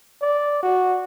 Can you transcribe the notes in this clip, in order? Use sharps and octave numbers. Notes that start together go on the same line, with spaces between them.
D5
F#4